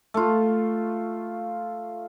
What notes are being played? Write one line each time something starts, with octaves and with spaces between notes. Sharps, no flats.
A3 F4